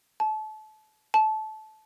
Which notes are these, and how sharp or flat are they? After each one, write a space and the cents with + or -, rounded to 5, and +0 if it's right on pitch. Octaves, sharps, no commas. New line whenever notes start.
A5 -30
A5 -20